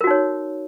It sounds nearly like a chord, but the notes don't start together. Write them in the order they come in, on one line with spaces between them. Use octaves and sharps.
A#4 F#4 D#4 C#5